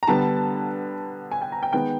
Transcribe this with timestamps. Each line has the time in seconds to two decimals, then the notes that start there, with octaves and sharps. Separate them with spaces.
0.03 A#5
0.08 D3 G3 B3 A5
1.31 G#5
1.42 G5
1.52 A#5
1.63 G5
1.73 D#3 G#3 B3 G5